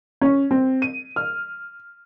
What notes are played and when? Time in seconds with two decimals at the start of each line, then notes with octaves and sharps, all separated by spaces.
0.22 C#4
0.51 C4
0.82 D#7
1.16 F6